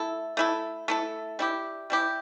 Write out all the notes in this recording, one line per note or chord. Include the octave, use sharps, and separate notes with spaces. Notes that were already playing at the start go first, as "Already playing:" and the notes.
Already playing: A3 E4 A4
A3 E4 A4
A3 E4 A4
G3 E4 G4
G3 E4 G4